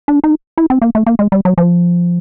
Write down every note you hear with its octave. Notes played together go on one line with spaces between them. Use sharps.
D4
D#4
E4
C4
A#3
A3
A#3
G#3
G3
F#3
F3